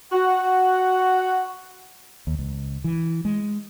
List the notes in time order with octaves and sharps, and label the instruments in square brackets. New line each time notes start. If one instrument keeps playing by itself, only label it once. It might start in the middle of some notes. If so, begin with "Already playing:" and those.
[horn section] F#4 F#5
[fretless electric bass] D#2
C#2
E3
G#3